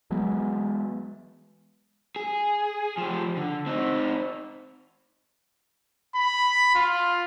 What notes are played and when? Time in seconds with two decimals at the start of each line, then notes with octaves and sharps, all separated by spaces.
0.11 E3 F#3 G#3 B3
2.16 G#4
2.98 F3 G4
3.37 D3
3.67 C4 D#4
6.16 B5
6.75 F4